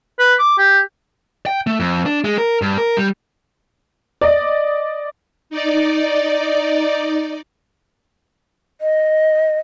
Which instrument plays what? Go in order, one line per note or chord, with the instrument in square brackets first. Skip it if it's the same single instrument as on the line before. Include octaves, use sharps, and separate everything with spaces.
[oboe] B4
D6
G4
[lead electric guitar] G5
A3
F2
D4
G#3
A#4
G2
A#4
G3
[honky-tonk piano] D5 D#5
[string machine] D#4 D5
[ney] D#5